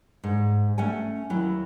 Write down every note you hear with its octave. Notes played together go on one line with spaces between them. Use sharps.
G#2
A3 C#4 F#5 G#5
D#2 F#3 E4